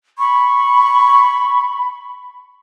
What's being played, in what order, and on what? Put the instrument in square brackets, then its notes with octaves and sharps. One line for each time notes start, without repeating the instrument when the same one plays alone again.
[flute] B5 [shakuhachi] C#6